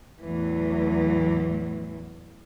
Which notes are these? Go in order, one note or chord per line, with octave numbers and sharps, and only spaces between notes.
E2 A2 E3 F#3